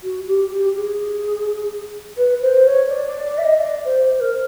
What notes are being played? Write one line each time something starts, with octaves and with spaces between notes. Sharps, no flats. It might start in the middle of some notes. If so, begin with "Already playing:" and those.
F#4
G4
G4
G#4
B4
C5
C#5
D5
D5
D5
E5
D#5
D5
C5
C5
A#4